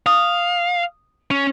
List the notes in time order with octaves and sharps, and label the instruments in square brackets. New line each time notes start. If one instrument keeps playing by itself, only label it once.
[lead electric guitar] F5 [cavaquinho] D#6
[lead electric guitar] C#4